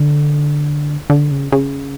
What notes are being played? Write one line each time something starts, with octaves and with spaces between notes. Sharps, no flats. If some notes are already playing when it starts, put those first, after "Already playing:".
Already playing: D3
D3
C#3
C#3